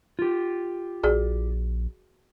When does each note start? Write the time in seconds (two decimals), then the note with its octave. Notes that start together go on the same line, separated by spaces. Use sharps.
0.19 F4 G4
1.03 A#1 F#4 G#4 D5